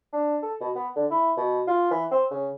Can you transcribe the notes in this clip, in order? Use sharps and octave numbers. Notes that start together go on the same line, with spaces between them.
D4
A4
B2
B3
D3
E4
B2
F4
E3
C4
C#3